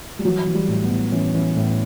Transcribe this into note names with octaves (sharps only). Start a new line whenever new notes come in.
G3
E3 F#3
E3
G3
A2
B3
A2
E3 C#4
E3 C#4
A2 B3